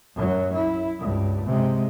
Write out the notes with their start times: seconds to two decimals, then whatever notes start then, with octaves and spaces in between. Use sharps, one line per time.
0.15 F#2 F#3
0.53 E4
0.99 C#2 G2
1.46 C3 G#3